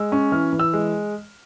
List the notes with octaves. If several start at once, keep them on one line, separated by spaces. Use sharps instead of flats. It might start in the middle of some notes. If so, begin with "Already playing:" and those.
Already playing: G#3 E6
C#4
E3 F6
E3
E6
G#3